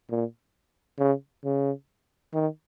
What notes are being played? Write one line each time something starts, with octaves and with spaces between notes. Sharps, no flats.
A#2
C#3
C#3
D#3